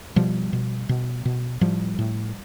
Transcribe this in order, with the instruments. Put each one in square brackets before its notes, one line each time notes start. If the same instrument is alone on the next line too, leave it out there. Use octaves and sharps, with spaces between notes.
[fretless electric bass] B2 F3 G3
B2
B2
B2
A2 F3 G3
A2